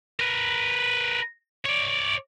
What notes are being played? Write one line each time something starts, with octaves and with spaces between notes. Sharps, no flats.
A#4 B4
C#5 D5